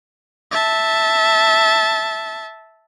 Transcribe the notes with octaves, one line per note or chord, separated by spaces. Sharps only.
E5 A5